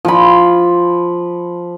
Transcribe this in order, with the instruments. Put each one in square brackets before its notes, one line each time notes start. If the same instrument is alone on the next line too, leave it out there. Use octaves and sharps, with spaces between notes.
[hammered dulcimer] F3 B5